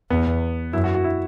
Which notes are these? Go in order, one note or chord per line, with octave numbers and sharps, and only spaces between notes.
E2 B3
F#2 E4
F#4
F#4
E4